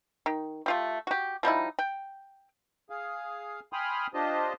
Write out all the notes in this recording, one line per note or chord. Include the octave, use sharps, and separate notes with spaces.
D#3
A3 F4 G4
F#4 G4
F3 G3 D#4 E4
G5
G#4 F5
G5 G#5 B5 C6 D#6 F6
D4 F4 G4 C5 D#5